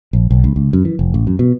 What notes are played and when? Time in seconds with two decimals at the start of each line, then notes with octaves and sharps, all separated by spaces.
0.13 A#1
0.31 B1
0.44 C#2
0.56 C#2
0.73 F#2
0.85 E3
0.99 F1
1.14 A1
1.27 F#2
1.39 B2